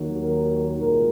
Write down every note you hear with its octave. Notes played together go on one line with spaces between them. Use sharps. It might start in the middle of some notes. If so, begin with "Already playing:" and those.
Already playing: D#2 D#3 F#3
A#4
C2 A#2 G#3 A#4